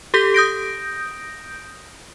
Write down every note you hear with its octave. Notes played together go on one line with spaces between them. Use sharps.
G4 A4 G6 B6 G7
D#6 G6 A#6 D7